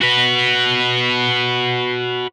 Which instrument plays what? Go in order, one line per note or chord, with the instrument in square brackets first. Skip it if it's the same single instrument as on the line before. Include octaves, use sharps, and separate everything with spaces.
[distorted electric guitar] F#4 B4